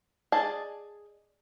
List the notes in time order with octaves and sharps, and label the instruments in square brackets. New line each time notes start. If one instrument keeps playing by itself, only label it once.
[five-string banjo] G#4 D5 D#5 A5